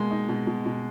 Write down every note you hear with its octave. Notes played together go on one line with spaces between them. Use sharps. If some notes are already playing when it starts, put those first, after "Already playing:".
Already playing: B2 G#3 A#3
D#4
B2
B2
B2